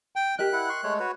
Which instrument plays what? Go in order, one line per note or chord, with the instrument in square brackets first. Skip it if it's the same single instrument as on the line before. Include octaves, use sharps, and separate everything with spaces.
[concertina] G5
[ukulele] G4 A#4 D#5 [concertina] F#6
[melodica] E4 F#5
C6 C#6
G#3 A3 C#5
F#4 B4 C#5